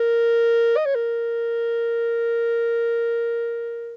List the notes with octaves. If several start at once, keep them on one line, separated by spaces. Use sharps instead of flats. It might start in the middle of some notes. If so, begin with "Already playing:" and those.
Already playing: A#4
D#5
C#5
A#4